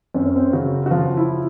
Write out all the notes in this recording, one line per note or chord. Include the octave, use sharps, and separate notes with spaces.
F#2 C4
C#4
C4
C#3 F#4
F#4
F3 F4
E4